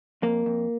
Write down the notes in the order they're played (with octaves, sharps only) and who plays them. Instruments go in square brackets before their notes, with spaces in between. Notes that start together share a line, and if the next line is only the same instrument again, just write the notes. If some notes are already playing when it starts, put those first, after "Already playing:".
[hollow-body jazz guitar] F2 A#3
F2